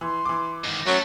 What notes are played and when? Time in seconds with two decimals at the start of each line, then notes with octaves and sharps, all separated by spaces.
0.01 E3 C6
0.25 E3 D6
0.65 G#2 D#3
0.87 F#3 A3 C#4